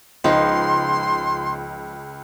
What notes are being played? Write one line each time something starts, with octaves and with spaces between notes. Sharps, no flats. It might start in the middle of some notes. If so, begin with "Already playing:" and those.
C#2 F3 D#4 C6